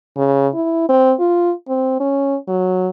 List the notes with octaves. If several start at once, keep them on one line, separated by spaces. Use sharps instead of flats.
C#3
E4
C4
F4
C4
C#4
F#3